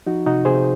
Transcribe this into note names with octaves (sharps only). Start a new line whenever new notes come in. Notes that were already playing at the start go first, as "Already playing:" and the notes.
F3 D#4 F#4
C3 D#4 F#4
C3 G#4 C5